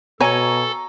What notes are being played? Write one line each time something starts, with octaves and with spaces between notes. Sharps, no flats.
B2 A4 C#5 G#5 A#5 C#6